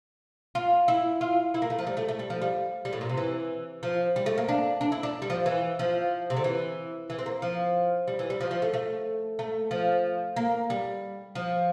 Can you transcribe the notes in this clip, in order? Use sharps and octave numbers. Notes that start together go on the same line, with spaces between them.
F4
E4
F4
E4
A#3
A3
F3
G3
A3
A3
G3
F3
G3
G3
A2
A#2
C3
E3
F3
G3
A3
A#3
D4
D4
E4
D4
G3
F3
E3
F3
C3
D3
E3
E3
C4
A#3
F3
G3
E3
G3
F3
F3
A3
A3
A3
F3
A#3
G3
F3